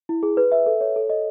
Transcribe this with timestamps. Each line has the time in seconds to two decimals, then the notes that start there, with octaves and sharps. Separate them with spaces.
0.09 E4
0.23 G#4
0.37 B4
0.52 E5
0.66 A4
0.81 C#5
0.96 A4
1.10 D#5